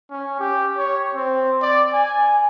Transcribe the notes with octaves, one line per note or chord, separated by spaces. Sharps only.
C#4
G4
C#5
C4
D5
G#5